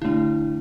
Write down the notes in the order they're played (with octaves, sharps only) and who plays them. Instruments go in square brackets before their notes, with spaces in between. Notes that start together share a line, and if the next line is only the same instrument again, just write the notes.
[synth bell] D3 A3 D4 E4